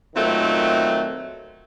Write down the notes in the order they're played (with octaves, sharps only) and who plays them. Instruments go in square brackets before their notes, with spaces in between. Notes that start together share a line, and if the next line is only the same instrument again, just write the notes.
[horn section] A#2 D#3 F#3 A3 C4